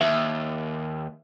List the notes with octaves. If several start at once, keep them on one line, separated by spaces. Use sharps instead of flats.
D#2 E5